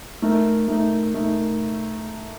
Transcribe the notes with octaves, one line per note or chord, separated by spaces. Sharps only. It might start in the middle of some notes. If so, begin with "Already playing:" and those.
A3 D#4 A#4
A3 D#4 A#4
A3 D#4 A#4